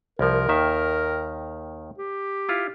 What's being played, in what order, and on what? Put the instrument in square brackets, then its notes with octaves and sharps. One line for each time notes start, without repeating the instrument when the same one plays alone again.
[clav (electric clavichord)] C2 F3 [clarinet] A#4
[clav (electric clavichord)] D#2 D#3 E5
[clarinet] G4
[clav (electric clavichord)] E4 F4